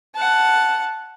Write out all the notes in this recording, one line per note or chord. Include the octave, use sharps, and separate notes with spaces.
F#5 A5